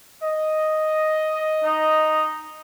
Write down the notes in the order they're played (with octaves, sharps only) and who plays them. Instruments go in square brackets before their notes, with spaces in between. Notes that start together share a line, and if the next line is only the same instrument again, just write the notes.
[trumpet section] D#5
[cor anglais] D#4